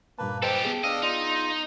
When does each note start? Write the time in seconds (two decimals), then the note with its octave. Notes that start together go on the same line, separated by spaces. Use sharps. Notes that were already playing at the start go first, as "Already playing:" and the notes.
0.19 G2 A#2 A#3 B4 A5
0.42 G4 A4 B4 C5 D#5 G5
0.64 B3 G#4
0.84 D4 D#5 F5 E6
1.02 D#4 F4